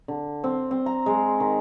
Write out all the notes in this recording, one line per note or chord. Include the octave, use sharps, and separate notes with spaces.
D3
C4
C4
A#5
G#3
D#3